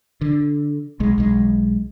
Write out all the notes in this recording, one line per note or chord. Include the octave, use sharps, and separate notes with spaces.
D3
B1 G#3
B1 G#3